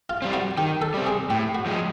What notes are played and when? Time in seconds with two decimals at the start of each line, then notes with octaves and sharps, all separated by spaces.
0.10 F4
0.22 G3 C4
0.33 F#4
0.57 D#3 G4
0.82 A4
0.94 G3 C4
1.06 G#4
1.30 A2 G4
1.55 F#4
1.66 F3 G#3